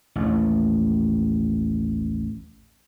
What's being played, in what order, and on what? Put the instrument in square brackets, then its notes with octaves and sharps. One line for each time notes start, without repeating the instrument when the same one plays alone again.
[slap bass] A1 D#2